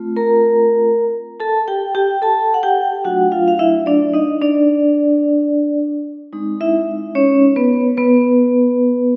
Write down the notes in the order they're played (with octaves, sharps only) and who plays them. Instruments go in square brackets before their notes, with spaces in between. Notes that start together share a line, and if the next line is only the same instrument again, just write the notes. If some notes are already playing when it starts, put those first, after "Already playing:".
Already playing: [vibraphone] A3 C4 F4
A#4 A#5
A4 A5
G4 G5
G4 G5
A4 A5
F#5
G4 G5
F#3 A3 D4 F4 F#4 F#5
F4 F5
F5
E4 E5
D4 D5
D#4 D#5
D4 D5
G#3 C4 D#4
E4 E5
C#4 C#5
B3 B4
B3 B4